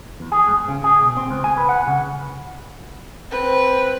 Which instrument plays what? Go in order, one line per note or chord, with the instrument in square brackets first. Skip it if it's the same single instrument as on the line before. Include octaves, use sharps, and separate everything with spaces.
[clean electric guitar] E2
G#4
G#2
C#3
G#4
B2
C4
C#2
G#5
B4
F#5
C#3
[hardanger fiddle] C4 B4